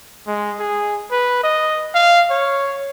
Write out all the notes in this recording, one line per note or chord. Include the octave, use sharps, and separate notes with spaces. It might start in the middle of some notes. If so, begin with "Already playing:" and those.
G#3
G#4
B4
D#5
F5
C#5